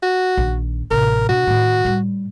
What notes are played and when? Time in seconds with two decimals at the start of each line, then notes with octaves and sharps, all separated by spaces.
0.03 F#4
0.37 A#1 D#3
0.91 A1 C3 A#4
1.29 B2 D4 F#4
1.47 A2 D#3
1.85 A2 G3